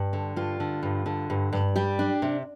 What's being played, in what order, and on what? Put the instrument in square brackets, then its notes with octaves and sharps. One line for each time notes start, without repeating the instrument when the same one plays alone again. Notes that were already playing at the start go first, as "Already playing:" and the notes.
Already playing: [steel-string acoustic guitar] G2
D3
G2 F4
D3
G2
D3
G2
G2
G3 G4
D4
C3